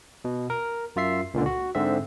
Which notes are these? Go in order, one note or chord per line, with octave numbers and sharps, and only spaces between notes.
B2
A#4
F#2 F4 E5 C7
C#2 A#2 D3
F#4
G#2 D3 C4 E5